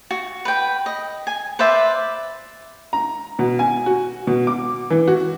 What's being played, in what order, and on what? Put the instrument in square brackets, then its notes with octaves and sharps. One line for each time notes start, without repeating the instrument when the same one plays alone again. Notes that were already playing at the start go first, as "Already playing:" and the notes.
[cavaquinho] F#4
B4 G5
D#5
G#5
B4 C5 D5 E5
[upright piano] A#5
B2
G#5
F#4
B2
D6
E3
F#4